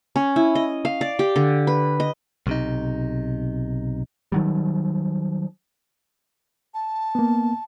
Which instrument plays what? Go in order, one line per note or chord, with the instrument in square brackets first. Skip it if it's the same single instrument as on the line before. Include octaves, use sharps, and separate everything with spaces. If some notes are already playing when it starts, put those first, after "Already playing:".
[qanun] C#4
E4
D#5
F5
D5
G4
D3
B4
D#5
[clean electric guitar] B1 C3 D#4
[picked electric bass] D#3 F#3 G3
[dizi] A5
[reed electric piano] A#3 B3